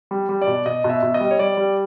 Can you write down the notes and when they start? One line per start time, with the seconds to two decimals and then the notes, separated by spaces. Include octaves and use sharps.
0.11 G3
0.29 G3
0.41 D5
0.47 B2
0.66 B2 D#5
0.84 B2
0.90 E5
1.03 B2
1.14 D#5
1.21 G3
1.31 C#5
1.39 G3 D5
1.57 G3